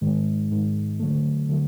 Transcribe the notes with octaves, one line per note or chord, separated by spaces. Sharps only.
G#2 D#3 G#3
G#2 D#3 G#3
D3 F#3 A3
D3 F#3 A3